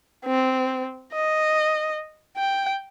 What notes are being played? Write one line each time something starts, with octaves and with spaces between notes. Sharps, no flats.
C4
D#5
G5